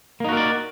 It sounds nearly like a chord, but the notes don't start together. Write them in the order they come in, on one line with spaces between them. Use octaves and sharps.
A#3 D#4 F#4 A#4 D5